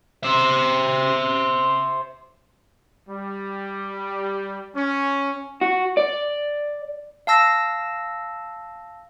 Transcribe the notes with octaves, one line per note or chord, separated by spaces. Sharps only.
C5 E5
G3
C#4
F#4
D5
F5 A5 E6 A#6